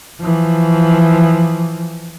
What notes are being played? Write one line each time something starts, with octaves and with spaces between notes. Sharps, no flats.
E3 F3